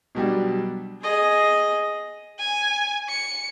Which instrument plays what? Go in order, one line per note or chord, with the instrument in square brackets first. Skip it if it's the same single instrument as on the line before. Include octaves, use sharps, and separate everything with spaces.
[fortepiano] B2 F#3 G3 D4
[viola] G#4 D#5
[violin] G#5
C#7